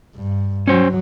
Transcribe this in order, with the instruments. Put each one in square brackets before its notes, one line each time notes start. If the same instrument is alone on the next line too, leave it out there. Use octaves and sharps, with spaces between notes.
[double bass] G2
[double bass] F#3 [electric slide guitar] C#4 C5